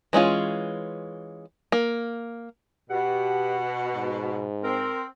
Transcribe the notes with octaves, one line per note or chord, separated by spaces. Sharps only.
E3 G#3 C#4 F4
A#3
B2 G4 F#5
G#2
C4 A#4